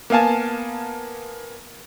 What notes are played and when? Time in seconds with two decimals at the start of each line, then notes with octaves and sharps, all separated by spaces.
0.10 A#3 B3 F5 G#5 A5